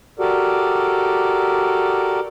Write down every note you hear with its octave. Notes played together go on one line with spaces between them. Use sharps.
F#4 G4 A4 A#4 D5